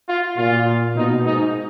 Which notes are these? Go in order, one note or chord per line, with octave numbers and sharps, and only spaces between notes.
F4
A#2 F4
B2 D#4
G#2 D#4